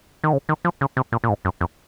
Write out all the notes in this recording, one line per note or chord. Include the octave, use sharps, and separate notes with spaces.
D#3
C#3
D#3
F3
C#3
C3
A#2
A#2
G#2
F#2
F2